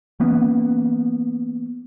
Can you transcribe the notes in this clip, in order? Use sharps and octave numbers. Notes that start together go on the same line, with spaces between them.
E3 A#3 B3 C#4